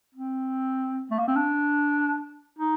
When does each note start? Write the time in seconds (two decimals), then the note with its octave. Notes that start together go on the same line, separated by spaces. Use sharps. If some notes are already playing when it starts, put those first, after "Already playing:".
0.14 C4
1.11 A3
1.19 A#3
1.27 C4
1.36 D4
2.58 D#4